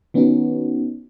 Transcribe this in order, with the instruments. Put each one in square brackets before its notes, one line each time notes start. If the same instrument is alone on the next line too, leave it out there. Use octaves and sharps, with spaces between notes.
[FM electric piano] D#3 B3 C#4 D#4 F#4